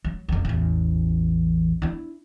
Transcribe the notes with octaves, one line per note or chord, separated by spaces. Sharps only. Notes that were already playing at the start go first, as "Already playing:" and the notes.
F#3
F1 F2
A1 E2
D4 E4